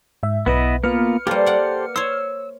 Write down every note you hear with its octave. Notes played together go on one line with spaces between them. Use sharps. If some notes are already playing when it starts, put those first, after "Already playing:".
G#2 E5
B1 B3 E4 B4 D#5
A#3 B3 F4 B4 F6 C#7
G3 A#3 G4 A4 C5
D5 F#5
C5 C#5 E6